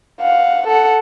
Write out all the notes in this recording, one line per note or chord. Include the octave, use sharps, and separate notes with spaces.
F5 F#5
A4 F#5